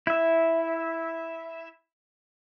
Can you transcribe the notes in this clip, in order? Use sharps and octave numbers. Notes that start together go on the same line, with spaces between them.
E4 E5